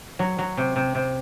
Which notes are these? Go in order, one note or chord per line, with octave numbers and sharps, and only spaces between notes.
F#3
F#3
C3
C3
C3